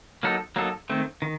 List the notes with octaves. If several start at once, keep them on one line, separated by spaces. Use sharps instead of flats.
F#3 A#3 D#4 A4
F#3 A#3 D#4 A4
D#3 A3 C4
D#3